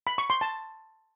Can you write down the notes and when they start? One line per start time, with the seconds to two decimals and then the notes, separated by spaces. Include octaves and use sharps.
0.07 B5
0.18 C#6
0.30 C6
0.41 A5